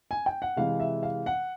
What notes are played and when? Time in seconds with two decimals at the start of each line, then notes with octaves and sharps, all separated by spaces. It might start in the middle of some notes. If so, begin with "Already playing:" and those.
0.11 G#5
0.26 G5
0.42 F#5
0.57 C3 E3 G#3 F5
0.80 E5
1.03 F5
1.26 F#5